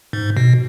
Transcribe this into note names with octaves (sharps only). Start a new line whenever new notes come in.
G#2
B2